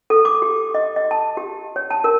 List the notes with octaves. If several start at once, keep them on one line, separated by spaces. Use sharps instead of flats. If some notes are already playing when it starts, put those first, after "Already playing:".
A4
D6
G4
D#5
D#5
A5
G4
C#5
A5
A#4